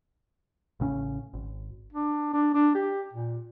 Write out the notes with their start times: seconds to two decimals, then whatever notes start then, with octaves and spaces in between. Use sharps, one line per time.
0.80 A1 C#3 C4 C#4
1.34 G#1
1.93 D4
2.34 D4
2.54 D4
2.75 G4
3.13 A#2